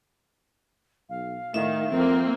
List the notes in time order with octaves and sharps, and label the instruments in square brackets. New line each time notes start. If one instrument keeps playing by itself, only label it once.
[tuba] B1 [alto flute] F5
[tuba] A2 [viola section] D#3 [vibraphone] E5
[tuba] F2 [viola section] A#3 C4 [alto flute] A#4